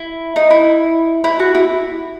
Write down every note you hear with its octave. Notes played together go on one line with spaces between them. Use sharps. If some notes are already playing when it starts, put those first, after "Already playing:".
Already playing: E4
D#4
E4
E4
F#4
E4